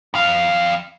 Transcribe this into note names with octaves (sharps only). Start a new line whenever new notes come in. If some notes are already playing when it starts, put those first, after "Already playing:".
F2 F5